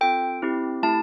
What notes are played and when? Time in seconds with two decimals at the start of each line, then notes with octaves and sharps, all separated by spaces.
0.01 C4 F4 A4 G5
0.42 C4 E4 G4
0.83 A3 E4 G4 A5